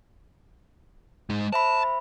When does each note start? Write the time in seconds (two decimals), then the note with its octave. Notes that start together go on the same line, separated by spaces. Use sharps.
1.30 G#3 D#4
1.53 C5 E5 A5 B5